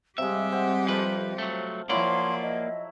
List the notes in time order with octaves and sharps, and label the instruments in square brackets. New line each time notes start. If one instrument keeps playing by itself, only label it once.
[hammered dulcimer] C3 G#3 [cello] G3 G4 [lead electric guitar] E5 [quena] F5
[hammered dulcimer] C4 [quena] F#5
[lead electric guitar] F2 B4 [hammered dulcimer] F4 A4 [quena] C5
[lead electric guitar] F#3 A3
[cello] F3 [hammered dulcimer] F#3 E4 [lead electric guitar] A#3 D5 [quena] C6
[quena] D#5